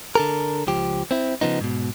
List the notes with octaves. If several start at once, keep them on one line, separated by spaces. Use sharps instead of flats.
D3 A4 A#4
C#2 F3 G4
C4 E4
C#3 F3 B3 D#4
G#2 B2